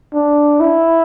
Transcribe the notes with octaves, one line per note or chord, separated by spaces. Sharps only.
D4
E4